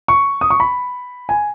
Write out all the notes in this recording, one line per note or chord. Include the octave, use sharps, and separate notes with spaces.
C#6
D#6
C#6
B5
G#5